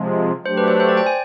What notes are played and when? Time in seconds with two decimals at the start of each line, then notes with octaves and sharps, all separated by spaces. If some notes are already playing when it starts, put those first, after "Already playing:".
Already playing: C3 F3 G#3
0.45 F#3 A3 D4 G4 C5
0.57 B4
0.68 C5
0.80 C5
0.89 D5
0.97 G5
1.06 G#5